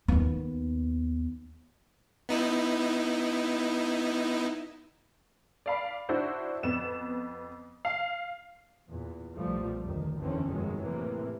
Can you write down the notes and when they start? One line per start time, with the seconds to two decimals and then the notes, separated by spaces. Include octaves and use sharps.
0.08 D#2 B3
2.29 B3 D#4 E4
5.66 D5 F5 B5
6.09 D4 E4 F#4 C5
6.63 F2 B3 E7
7.85 F5
8.89 E2 A#2
9.35 B1 A#2 F3 G3 A3
9.83 F1 D2 D#3
10.18 F#1 E2 D3 E3 C4 C#4
10.48 F1 G2 B2 D#3 F#3 G#3
10.80 A2 C3 E3 A#3